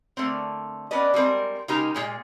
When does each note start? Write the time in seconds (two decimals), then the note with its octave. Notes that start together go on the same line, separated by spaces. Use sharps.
0.17 D3 A3 A#3 C4
0.91 B3 C#4 D4 B4 D5 D#5
1.14 G3 G#3 C4 A#4
1.68 C#3 G#3 D#4 G4 A#4 A#5
1.95 A#2 G#3 G#4